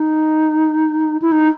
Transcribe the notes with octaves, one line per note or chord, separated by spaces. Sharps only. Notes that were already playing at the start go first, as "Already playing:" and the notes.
Already playing: D#4
E4
D#4